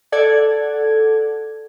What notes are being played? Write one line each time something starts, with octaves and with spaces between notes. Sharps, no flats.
A4 D5 F#5 G#6